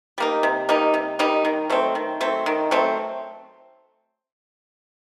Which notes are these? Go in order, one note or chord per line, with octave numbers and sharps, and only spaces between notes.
G3 A#3 D#4
C3
G3 A#3 D#4
C3
G3 A#3 D#4
D#3
F#3 A3 C4
D#3
F#3 A3 C4
D#3
F#3 A3 C4